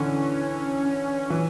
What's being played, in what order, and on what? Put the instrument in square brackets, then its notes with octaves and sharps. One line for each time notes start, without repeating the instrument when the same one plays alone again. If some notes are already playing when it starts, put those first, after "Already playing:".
Already playing: [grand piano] D3 E3 [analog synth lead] C#4
[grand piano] E3